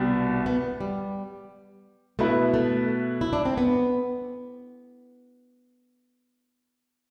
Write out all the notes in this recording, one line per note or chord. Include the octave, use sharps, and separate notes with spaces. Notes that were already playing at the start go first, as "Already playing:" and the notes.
Already playing: C2 B2 B3 D4 G4
B3
G3
B2 A3 B3 E4 B4
A3
E4
D4
C4
B3